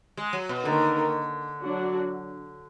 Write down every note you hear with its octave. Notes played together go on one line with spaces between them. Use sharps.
G#3
F#3
B2
D3 D#3 A#3 D#4 A#4
F#3 D4 F#4